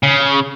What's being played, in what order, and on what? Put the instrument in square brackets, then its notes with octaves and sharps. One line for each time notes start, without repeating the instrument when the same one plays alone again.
[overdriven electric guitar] C#3